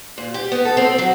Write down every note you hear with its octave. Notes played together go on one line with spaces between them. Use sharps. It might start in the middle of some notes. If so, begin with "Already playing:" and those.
A#2
G4
B3
A4
C4
F#3